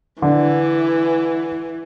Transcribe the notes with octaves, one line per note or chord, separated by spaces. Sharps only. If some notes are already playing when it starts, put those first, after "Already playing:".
D3 E3